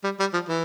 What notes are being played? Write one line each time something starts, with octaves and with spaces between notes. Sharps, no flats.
G3
G3
F3
E3